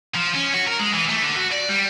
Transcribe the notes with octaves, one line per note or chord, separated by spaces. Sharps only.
F3
C#4
F#4
A#4
G#3
E3
A3
D3
F#4
D5
G3